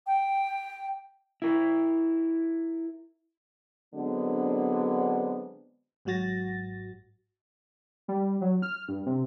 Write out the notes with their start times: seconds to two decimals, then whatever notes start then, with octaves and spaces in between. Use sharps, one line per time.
0.07 G5
1.42 E4 A#4
3.95 D3 F#3 G#3 B3 C4 D4
6.05 G#1 G#2 F#3 F#4 A6 A#6
8.08 G3
8.41 F#3
8.62 F6
8.88 G2
9.06 C3